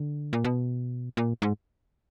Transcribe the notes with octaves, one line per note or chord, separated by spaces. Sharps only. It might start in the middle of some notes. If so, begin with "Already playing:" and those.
Already playing: D3
A#2
B2
A#2
G#2